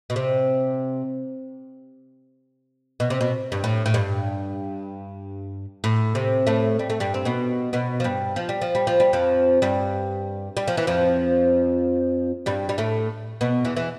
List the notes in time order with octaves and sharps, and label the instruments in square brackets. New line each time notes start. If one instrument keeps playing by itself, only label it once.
[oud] B2
C3
B2
C3
B2
G2
A2
A2
G2
A2
C3
A2 A3
G3
A3
G2 G3
C4
B2 B3
B2 B3
F3
G2 G3
F3
G3
F3
G3
F3
G3
F2 F3
G2 G3
G3
F3
E3
F2 F3
G2 G3
G3
A2 A3
B2 B3
E2 E3
E3